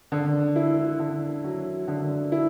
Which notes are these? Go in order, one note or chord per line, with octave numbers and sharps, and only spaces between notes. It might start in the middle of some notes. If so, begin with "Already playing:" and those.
D3
E4
D3
F#3
D3
E4